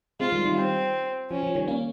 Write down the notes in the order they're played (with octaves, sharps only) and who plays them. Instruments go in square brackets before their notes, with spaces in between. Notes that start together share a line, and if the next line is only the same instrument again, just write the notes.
[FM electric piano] G#3 C4 [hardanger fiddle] F4
[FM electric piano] D#3 G3
D#3 G3
[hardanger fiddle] C4
[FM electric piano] F3 [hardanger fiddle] C#4
[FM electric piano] F3
D#3 G3
A#3 C#4